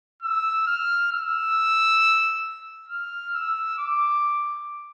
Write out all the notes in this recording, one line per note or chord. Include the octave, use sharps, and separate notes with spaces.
E6
F6
E6
F6
E6
D6